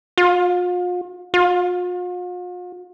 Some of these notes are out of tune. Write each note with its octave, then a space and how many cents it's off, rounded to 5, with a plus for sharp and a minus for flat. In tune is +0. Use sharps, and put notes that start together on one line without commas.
F4 +40
F4 +45